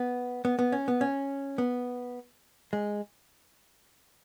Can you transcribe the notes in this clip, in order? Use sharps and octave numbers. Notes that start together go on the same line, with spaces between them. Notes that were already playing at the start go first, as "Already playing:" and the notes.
Already playing: B3
B3
B3
C#4
B3
C#4
B3
G#3